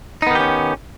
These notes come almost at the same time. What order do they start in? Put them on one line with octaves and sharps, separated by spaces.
D#4 B3 D#3 G4 C#4